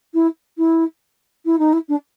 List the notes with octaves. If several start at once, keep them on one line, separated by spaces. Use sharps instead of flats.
E4
E4
E4
D#4
E4
D4